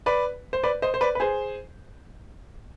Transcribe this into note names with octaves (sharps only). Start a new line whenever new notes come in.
B4 D5
C5
B4 D5
C5 D#5
C5
B4 D5
B4
G#4 C5